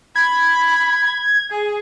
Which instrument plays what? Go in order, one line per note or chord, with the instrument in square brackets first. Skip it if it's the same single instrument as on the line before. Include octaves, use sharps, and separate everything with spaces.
[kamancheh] B5 [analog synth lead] G#6
[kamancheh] G#4